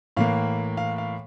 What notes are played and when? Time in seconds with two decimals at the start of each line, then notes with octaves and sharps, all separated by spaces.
0.17 A2 E3 A#3 F5
0.77 F5
0.98 F5